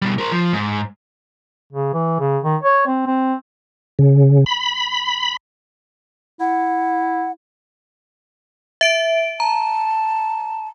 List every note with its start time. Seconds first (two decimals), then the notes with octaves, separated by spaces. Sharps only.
0.02 B2 G3
0.18 A#4 C5
0.32 F3
0.53 G#2
1.73 C#3
1.94 E3
2.20 C#3
2.44 D#3
2.63 C#5
2.87 C4
3.06 C4
3.99 C#3
4.46 B5
6.40 E4 F#5
8.81 E5 D7
9.40 A5 A#5